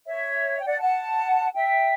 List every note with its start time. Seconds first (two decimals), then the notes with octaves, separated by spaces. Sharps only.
0.07 C#5 E5
0.60 G5
0.65 D5 F#5
0.81 F#5 A5
1.56 E5 G5